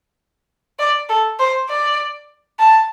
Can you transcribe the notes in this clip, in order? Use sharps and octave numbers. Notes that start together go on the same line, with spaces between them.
D5
A4
C5
D5
A5